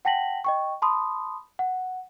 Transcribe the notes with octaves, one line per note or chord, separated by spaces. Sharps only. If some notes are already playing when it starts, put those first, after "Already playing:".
F#5 G5 A5 A#6 B6 F#7
D#5 G5 C#6
A5 B5 C6 D#6
F#5